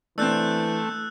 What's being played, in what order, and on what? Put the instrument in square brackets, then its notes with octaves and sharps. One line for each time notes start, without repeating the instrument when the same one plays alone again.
[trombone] E3 [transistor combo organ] A3 [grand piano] C4 D4 [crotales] E6 F#6 G6